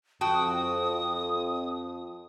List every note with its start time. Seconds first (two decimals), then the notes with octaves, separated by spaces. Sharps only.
0.21 F2 F#4 G5 A5 D#6